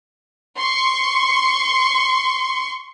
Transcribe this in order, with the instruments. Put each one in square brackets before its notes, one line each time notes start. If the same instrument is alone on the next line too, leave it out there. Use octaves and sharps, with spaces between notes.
[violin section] C6 C#6 C#7